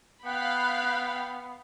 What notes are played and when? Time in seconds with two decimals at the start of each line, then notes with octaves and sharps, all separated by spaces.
0.25 B3 F5 G5 B5 F#6